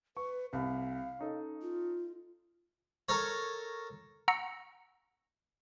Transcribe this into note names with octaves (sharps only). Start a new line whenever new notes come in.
B4 C#6
C2 F5
C#4 D#4 A4
F4
A4 A#4 C#5
F#5 A#5 C#6 E6 A#6 C#7